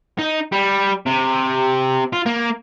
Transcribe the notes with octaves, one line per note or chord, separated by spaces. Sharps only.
D#4
G3
C3
F4
A#3